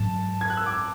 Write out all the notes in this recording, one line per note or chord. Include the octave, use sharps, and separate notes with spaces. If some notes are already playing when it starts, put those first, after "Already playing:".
Already playing: G#2 F#3 C#4 A5
G#6
F#6
E6
D6